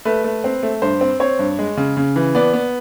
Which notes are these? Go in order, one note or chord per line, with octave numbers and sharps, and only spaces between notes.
A3 B4
A3
C4
A3
G2 C5
C4
C4 C#5
G2
G#3
C#3
C#3
E3
B3 D5
B3